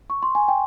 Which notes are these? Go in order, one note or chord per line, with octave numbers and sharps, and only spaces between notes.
C#6
C6
G#5
G5